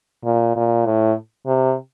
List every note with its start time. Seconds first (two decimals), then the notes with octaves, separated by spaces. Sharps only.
0.25 A#2
0.56 A#2
0.86 A2
1.47 C3